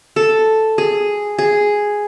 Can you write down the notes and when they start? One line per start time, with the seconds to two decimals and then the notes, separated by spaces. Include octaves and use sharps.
0.16 A4
0.78 G#4
1.38 G#4